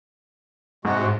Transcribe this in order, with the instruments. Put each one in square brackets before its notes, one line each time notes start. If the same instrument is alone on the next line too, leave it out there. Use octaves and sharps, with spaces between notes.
[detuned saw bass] G#2 [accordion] C3 G#3 F#4